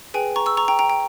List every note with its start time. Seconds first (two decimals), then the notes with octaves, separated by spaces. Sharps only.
0.14 G#4 B4 G5 G#5
0.36 A#5 C#6
0.46 C#6 E6
0.57 A#5 C#6
0.68 G5 A#5
0.79 G5 A#5
0.90 G5